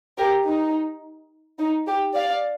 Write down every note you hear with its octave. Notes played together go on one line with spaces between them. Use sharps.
G4 A#4
D#4
D#4
G4
D5 F5